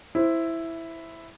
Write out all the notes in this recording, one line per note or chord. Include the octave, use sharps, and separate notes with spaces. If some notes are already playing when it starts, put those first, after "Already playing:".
E4 C5